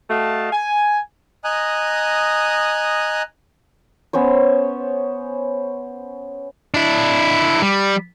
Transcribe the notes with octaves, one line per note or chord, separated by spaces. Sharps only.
A3 F#4 D#5 F5 A5
G#5
D#5 G#5 A#5 D#6 F#6
B3 C#4 C5 C#5
D4 E4
G3